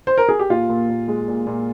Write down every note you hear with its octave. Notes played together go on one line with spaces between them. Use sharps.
C5
A#4
G#4
G4
A#2 F4
A#2
A#2
G#3
A#2
A#2